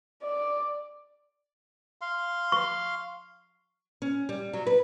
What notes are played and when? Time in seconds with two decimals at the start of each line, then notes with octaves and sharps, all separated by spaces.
0.23 D5
2.01 F5 C6
2.52 C#6
4.02 C#4
4.29 G3
4.53 F#3
4.67 B4